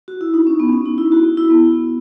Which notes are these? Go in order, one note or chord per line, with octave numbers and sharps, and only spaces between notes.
F#4
E4
D#4
C#4
B3
C#4
D#4
E4
F#4
E4
B3